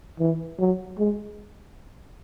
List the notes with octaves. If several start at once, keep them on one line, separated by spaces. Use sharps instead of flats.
E3
F#3
G#3